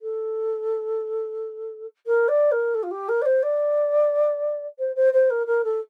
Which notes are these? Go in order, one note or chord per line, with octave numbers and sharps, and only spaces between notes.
A4
A#4
D5
A#4
A4
F4
G4
A#4
D5
C5
D5
C5
C5
C5
A#4
A#4
A4